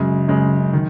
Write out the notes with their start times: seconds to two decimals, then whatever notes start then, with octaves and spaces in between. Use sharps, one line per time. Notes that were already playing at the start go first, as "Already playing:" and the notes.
Already playing: F#2 C#3 G#3
0.28 F#2 C#3 G#3
0.73 D#3